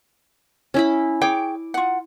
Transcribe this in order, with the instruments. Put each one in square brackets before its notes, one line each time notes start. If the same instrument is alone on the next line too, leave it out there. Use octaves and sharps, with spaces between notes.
[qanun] C#4 E4 B5
[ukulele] G#4 C#5 G5 [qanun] D6
[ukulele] F4 F#5